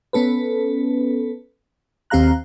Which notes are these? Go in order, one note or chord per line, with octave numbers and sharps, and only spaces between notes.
B3 C#4 A4 B4
D#2 C4 G4 F5 A#5 F#6